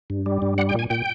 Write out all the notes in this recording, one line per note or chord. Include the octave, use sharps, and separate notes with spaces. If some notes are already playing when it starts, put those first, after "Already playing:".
G2
G3
G2
G3 F#5
G5
A#2 G#5
A#2 G5